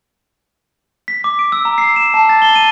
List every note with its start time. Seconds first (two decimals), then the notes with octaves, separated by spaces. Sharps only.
1.08 B6
1.24 D6
1.39 D7
1.52 E6
1.65 A#5
1.78 C7
1.96 E7
2.14 A5
2.29 A6
2.42 G7
2.56 D#7